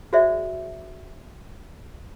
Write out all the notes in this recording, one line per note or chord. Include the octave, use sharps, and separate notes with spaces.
F#4 G#4 C5 D5 E5